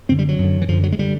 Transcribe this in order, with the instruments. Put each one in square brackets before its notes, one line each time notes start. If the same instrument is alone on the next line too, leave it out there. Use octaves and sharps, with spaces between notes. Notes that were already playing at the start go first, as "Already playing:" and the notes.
[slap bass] F#2 D3 C4
G3
F#3
F#2
D3
E3
F#2 D3 F3
F#3
G#3
D3 G3